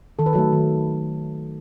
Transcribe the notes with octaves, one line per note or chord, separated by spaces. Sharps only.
D#3 A4
B4
F#3 A3 A4
D#3